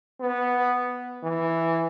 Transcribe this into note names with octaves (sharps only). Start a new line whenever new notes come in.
B3
E3